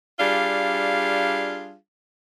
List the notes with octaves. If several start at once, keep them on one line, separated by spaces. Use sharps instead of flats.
G3 D4 F4 G#4 F5